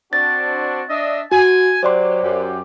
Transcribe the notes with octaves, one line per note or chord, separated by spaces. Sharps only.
C4 D4 F#4 A6
D4 D#5 E5
F#4 G#5
F#3 G4 C5 D5 C6
F#2 G4